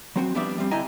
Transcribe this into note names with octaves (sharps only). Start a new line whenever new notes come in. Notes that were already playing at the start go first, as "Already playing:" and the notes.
F#3 C4 F#4
F3 G3 B3 D4 D5 E5
G3 C4
D3 E4 D#5 G5 G#5 A#5